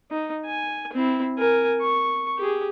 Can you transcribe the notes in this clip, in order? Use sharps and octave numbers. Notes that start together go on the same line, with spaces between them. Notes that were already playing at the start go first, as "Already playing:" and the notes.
D#4
G#5
C4 E4
A#4 G#5
C#6
G4 G#4